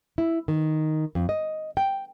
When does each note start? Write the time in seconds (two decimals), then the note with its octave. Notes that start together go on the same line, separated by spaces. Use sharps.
0.18 E4
0.48 D#3
1.15 F2
1.29 D#5
1.77 G5